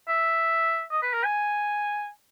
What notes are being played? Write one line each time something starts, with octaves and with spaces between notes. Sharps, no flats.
E5
D#5
B4
A#4
G#5